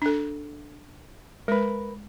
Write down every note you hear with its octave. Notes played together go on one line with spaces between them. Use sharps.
D4 A4
G#3 A#4 B4